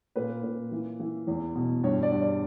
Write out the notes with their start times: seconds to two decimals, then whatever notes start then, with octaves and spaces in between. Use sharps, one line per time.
0.16 A#2 B4
0.43 A#2
0.71 E3
1.00 E3
1.27 E2
1.55 B2
1.83 G2 C#5
2.03 D5
2.12 G2
2.21 D5